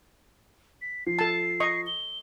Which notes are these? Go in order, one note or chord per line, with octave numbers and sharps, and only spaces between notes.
B6
F3 C7
A4 A5
D#5 C#6
G7